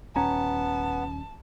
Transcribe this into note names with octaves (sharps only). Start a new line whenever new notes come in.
D#1 B3 C#4 A5 A#5